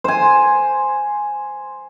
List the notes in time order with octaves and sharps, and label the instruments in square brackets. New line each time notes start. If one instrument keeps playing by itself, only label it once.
[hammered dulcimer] C5 G#5